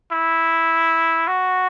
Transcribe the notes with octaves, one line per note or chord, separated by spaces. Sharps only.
E4
F#4